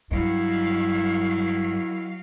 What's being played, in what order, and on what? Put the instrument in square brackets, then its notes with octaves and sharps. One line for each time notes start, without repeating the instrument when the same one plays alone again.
[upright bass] G2 [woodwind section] D#3 E4 [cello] F#3 F5